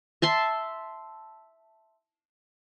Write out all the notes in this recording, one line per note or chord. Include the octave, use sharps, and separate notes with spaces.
E5 A5 C6